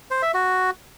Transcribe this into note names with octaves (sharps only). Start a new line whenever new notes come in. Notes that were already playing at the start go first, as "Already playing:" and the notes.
C5
E5
F#4